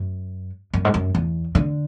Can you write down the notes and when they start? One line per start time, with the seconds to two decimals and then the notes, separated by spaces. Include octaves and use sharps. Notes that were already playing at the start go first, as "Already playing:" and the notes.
Already playing: F#2
0.74 F#2
0.85 G#2
0.94 F#2
1.15 E2
1.55 D3